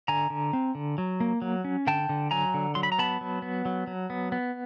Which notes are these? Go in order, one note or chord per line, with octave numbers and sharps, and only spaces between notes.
D3 G#5 A#5
D3
C4
D3
F#3
A#3
F#3
C#4
D3 G5 A5
D3
F#3 G#5 A#5
D3
F#3 C6
B5
A#5
B3 A5 B5
F#3
B3
F#3
F#3
B3
B3